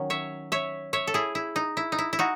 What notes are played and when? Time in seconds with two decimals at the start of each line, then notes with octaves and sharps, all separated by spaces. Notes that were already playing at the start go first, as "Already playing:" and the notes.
Already playing: D#3 F#3 C#4
0.10 C#5 E5
0.52 C#5 E5
0.93 C#5 E5
1.07 A4
1.14 E4 G#4
1.35 E4
1.56 D#4
1.77 E4
1.92 D#4
1.98 E4
2.13 E4
2.19 D#4 F#4